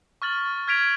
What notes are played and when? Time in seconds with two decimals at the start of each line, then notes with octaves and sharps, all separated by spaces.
0.22 C#6 F6 A6 F#7
0.68 F6 G#6 B6 D7 F7